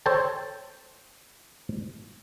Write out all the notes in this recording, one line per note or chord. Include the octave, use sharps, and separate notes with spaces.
A4 C5 C#5 G5 A5